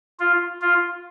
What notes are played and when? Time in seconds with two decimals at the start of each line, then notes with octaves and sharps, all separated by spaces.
0.20 F4
0.62 F4